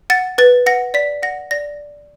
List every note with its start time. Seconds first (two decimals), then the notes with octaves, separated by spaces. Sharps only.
0.10 F#5 A6
0.38 B4 A6
0.66 F#5 A#6
0.94 D5 B6
1.23 F#5 A#6
1.51 D5 A#6